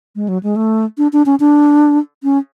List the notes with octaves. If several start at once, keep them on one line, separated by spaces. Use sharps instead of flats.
G#3
F#3
G#3
A3
D4
D4
C#4
D4
C#4